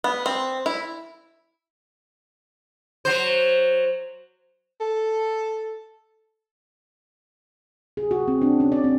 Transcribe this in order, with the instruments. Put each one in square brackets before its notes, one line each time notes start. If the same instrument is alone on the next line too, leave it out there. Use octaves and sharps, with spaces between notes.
[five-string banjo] B3
C4
E4
[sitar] F#3 C5
[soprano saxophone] A4
[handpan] G#4
F#4
C4
D4
C#4
D5
C4